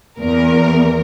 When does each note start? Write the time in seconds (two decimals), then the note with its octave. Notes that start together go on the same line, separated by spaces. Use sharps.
0.19 E2 A#4